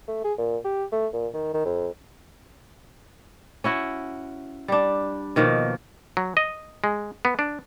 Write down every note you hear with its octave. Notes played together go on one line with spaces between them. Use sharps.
A3
G#4
A#2
G4
A3
A#2
D#3
D#3
F2
C#4 E4 F#4
G3 D4
B2 D#3 F3 A#3
F#3
D#5
G#3
B3
D4